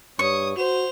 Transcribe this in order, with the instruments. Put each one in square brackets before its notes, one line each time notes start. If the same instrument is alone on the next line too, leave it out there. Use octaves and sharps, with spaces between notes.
[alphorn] G2 [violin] C#5 D#6 [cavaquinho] C#6
[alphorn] F#4 [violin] C5 F7